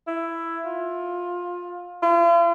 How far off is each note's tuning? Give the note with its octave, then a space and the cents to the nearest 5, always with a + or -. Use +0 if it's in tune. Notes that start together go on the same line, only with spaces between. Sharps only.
E4 +10
F4 +20
F4 -45